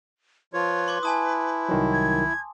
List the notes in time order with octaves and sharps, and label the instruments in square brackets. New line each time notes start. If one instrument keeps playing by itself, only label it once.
[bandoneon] F3 F4 C#5 [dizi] B4
[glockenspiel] C6 D6 G#6
[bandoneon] E4 [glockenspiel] G#5 A5 D#6
[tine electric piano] C2 D#3 F#3
[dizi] G#6